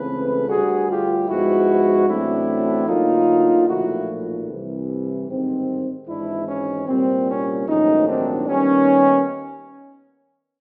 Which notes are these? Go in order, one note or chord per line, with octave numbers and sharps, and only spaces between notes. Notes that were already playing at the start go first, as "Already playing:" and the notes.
Already playing: C#2 C#3 E3 A3 C4 A4 B4
D2 D3 G3 F#4 G#4
F4 G4
G#2 F3 G#3 B3 E4 F#4
A1 A2 F#3 A3 C4 D4 E4
D2 D3 F#3 A#3 D#4 F4
B1 A#2 F3 A3 E4 F#4
C2 C3 E3
A1 G#2 D#3 G3 C4
G#1 G#2 E3 G#3 D4 E4
C#4
C2 A#2 G3 C4
C#4
A#1 G#2 D#3 F#3 A3 C#4 D#4
C4 D4
D#2 D#3 G3 B3 C#4